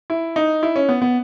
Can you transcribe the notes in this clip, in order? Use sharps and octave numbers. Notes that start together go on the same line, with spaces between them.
E4
D#4
E4
C#4
B3
B3